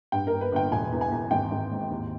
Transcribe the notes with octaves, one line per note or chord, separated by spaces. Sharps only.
G2 G5
A#4
G2
B4
G1 G5
E1 G#5
E2
G#5
E2
G#1 G5
G#1
G#2
D#2